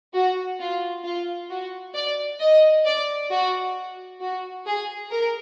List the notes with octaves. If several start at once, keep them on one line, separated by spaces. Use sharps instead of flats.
F#4
F4
F4
F#4
D5
D#5
D5
F#4
F#4
G#4
A#4